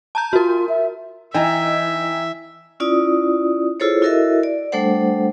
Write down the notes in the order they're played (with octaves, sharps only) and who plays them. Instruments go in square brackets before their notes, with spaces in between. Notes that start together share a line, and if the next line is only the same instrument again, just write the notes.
[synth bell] A5 A#5 G6
[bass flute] F4 [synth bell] F#4 A#4
[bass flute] E5
[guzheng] E3 [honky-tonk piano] D#4 [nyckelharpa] E5 [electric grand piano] G5 G#5 A#5
[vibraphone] C#4 E4 F4 D5 D#6
E4 F4 G#4 A4 C5 C#5
E4 F#4 A4 A#4 D#5 E5
D5
G3 A3 D4 A4 C5 F#5